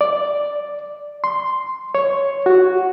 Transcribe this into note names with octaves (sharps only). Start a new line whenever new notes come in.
D5
C6
C#5
F#4